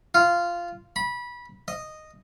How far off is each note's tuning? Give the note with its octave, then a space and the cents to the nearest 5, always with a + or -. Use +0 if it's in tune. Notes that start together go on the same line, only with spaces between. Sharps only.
F4 -10
B5 -20
D#5 -5